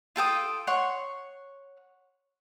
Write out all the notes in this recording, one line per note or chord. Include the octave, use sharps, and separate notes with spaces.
F4 A4 G5 D#6
C#5 F#5 C6 C#6